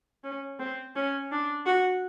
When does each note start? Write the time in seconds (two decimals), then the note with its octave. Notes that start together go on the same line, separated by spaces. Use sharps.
0.24 C#4
0.59 C4
0.96 C#4
1.31 D4
1.66 F#4